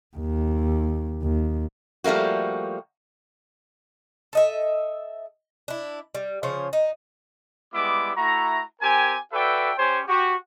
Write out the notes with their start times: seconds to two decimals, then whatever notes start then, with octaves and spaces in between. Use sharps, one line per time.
0.17 D#2
1.22 D#2
2.04 F3 G3 A3 A#3 F#4
4.33 A4 D#5 E5
5.68 D4 E4
6.15 G3
6.43 C#3 F3 C5 C#5
6.73 D#4
7.73 G3 G#3 B3 E4 D6
8.17 A3 E4 F#4 A#5
8.81 C4 G4 A#4 G#5
9.33 F#4 A4 B4 D5 E5 G5
9.78 C#4 G4 C5 C#5 G#5
10.08 F#4 G4